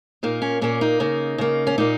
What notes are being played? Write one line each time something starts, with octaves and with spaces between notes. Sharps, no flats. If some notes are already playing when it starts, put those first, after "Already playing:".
A#2 A#3 D#4
C#4
A#2 A#3 C#4
D#4
C#3 A#3
C#3 A#3
C#4
A#2 A#3 D#4